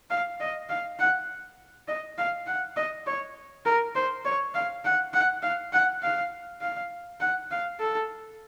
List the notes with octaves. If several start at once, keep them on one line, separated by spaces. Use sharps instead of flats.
F5
D#5
F5
F#5
D#5
F5
F#5
D#5
C#5
A#4
C5
C#5
F5
F#5
F#5
F5
F#5
F5
F5
F#5
F5
A4